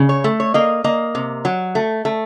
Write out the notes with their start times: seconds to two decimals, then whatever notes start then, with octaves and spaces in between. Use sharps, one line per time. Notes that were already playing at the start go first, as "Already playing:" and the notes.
Already playing: C#3
0.09 C#5
0.24 A3
0.40 C#5
0.54 A#3 D#5
0.84 A#3 D#5
1.15 C3
1.45 F#3
1.75 A3
2.05 A3